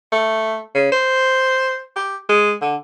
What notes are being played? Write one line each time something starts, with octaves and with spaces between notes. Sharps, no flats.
A3
C#3
C5
G4
G#3
D3